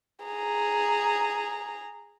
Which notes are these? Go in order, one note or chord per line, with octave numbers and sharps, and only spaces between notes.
G#4 A#5